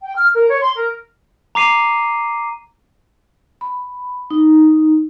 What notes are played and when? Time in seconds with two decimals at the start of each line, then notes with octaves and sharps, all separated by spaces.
0.02 G5
0.15 F6
0.33 A#4
0.48 C#5
0.60 C6
0.74 A#4
1.55 A#5 D6 C7 D#7
3.61 B5
4.31 D#4